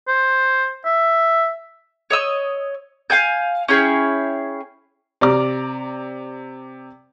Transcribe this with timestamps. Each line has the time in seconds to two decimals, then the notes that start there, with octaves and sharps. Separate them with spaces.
0.08 C5
0.85 E5
2.10 C#5 D#5 E6
3.10 F5 F#5 G#5 G6
3.68 C#4 E4 G#4 G5
5.21 C3 D5 A#5 D6